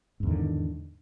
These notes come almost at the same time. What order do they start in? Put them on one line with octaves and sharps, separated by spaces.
G#2 E2 D#3 D3